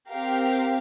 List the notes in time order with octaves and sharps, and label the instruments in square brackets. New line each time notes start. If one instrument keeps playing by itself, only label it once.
[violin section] C4 G4 A#4 F5